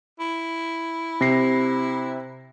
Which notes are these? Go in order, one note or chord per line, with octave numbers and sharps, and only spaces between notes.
E4
C3 A#6 C7